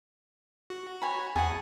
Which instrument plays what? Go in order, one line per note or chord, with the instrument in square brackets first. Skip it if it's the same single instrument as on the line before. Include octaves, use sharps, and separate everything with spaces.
[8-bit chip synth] F#4
[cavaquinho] C#5 G#5 B5
[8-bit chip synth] E2 F#5 [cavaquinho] G#4 G#5 A5